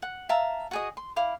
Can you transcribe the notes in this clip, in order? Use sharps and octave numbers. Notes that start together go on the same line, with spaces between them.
F#5
E5 F5 A5 A#5
F#4 G#4 D#5
C6
E4 F5 D6